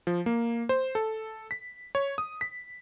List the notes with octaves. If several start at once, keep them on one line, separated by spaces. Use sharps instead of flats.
F3
A#3
C5
A4
B6
C#5
D#6
B6